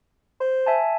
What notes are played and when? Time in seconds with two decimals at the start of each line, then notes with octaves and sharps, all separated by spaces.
0.40 C5
0.66 E5 G#5 A5